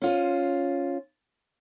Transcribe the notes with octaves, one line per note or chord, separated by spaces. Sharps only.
C#4 F4 C5